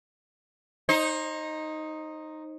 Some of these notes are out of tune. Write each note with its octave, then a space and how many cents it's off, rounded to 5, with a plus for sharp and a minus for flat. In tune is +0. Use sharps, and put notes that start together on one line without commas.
D#4 +0 C5 +30